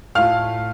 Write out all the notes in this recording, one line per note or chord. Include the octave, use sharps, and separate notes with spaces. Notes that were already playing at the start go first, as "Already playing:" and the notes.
A2 A3 F4 F5 F6